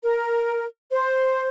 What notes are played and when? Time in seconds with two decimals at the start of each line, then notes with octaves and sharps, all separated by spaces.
0.02 A#4
0.90 C5